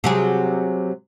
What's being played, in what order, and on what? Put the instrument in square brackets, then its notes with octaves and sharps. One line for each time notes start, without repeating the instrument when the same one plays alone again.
[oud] C3 F#3 G#4